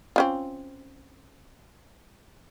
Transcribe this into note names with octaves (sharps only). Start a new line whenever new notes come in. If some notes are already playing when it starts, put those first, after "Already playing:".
C4 C#4 F4